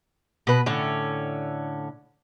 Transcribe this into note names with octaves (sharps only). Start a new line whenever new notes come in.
B2 B4
A2 D3 C#4